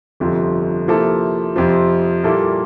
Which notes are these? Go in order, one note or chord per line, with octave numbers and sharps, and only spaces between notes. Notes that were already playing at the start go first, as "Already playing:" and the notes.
G1 F2 C3 F3
C3 F3 A#3 E4 A4
F2 C3 F3
A#2 G3 A#3 E4 A4